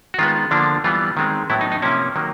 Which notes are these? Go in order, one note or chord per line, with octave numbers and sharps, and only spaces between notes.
F#4
D#3 G#3 B3 F4
D3 F3 A#3 D4
E3 G3 B3 F4
D#3 G#3 C4
A2 F#3 B3 E4
D#4
D#4
C3 F3 A#3 C#4 E4
D#3 F#3 A#3